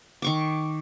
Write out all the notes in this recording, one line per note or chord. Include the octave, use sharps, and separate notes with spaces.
D#3 C#6 D6